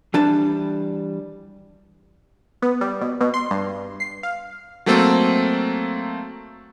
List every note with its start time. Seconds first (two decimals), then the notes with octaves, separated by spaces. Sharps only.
0.14 E3 G3 D4 B4 A5
2.62 B3
2.81 G3
3.01 B2
3.21 B2
3.34 C6
3.51 G2
4.00 C7
4.23 F5
4.86 F#3 A3 A#3 C4 A4